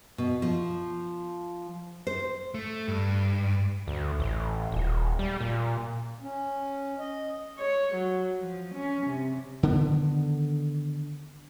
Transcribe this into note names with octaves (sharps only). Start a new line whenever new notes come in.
B2
F3
C5
A3
G2
D2
A1
D#1
G3
A#2
C#4
D#5
C#5
F#3
F3
C#4
C3
D3 D#3 B3